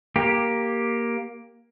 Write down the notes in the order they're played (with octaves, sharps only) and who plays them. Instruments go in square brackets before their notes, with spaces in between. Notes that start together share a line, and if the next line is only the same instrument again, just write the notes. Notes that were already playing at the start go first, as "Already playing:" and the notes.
[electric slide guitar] A#3 G4